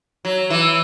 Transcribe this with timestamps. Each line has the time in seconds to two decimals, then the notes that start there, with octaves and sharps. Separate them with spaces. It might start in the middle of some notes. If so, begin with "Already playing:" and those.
0.25 F#3
0.50 E3